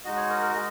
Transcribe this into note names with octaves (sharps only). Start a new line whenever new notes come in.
G#3 D#4 F#4 D#5
C#5
A#4
A#4
G#3